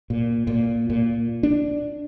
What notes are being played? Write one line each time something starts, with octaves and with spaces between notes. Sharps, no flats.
A#2
A#2
A#2
D4